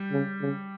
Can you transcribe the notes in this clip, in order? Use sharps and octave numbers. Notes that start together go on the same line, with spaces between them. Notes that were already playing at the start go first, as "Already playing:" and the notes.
Already playing: G3
C#3
C#3